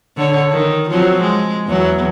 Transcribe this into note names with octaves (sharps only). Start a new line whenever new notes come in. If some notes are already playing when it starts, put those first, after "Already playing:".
D3 C#5
D#3
F3 F#3 C4
G#3
E2 F#3